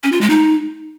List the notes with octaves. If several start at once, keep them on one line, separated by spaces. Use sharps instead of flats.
C#4
F4
G#3
D#4